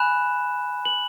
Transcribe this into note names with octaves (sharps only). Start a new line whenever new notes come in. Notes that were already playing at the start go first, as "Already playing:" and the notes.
Already playing: G#5 B5 F#6 E7
F#7